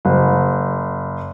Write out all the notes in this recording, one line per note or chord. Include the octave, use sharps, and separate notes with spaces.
F#1